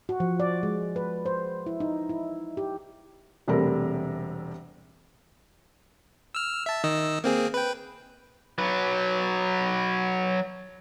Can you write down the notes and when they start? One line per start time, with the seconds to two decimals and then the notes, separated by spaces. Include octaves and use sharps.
0.09 F#4
0.20 F3
0.40 D5
0.63 G#3
0.96 B4
1.26 C5
1.66 E4
1.80 D#4
2.09 E4
2.57 G4
3.48 E1 C3 G3 A3 C4 A#4
6.35 E6 F6
6.66 E5 A5
6.84 D#3 D#5 E6
7.24 A#3 C4 G#4
7.54 B4 G5
8.58 F#3 B4